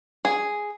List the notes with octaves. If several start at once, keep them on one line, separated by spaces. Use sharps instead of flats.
G#4